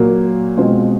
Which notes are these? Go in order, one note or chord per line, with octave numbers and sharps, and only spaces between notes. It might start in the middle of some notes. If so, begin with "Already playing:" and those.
Already playing: A#2 F#3 A#3
B2 G#3 C4 F4